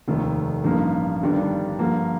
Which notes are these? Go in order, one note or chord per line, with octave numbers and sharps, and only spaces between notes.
F1 D#2 D#3 A3
A1 G2 F3 A#3 D#4
G1 G2 D#3 G3 D4
G2 D3 F3 A#3